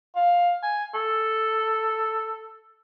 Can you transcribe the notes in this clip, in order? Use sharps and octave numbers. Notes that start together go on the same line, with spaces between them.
F5
G#5
A4